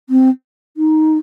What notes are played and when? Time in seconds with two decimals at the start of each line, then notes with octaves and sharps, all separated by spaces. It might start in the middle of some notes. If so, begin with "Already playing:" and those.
0.09 C4
0.77 D#4